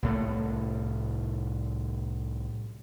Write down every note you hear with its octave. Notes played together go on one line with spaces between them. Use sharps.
C2 A2 A3